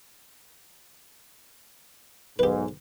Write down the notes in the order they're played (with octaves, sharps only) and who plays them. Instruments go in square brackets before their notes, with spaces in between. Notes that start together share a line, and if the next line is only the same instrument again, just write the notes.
[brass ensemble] B1 G#2 [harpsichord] G4 B4